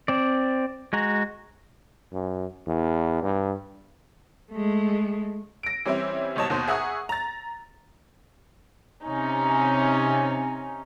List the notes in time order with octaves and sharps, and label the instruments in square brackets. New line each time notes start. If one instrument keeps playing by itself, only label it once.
[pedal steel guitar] C4 D5
G#3 F#4 A#5
[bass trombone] F#2
E2
G2
[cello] G#3 A3
[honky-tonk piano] A#6 D7
E3 G3 C4 C#4 E4
F#1 B2 G3 C#5 D#5 A5
D#2 B2 C5
G#4 E5 F#5 A#5 C#6 D#6
A#5 A6
[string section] C3 C#4 D#4